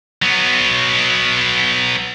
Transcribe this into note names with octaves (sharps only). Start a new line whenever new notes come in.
F#3 B3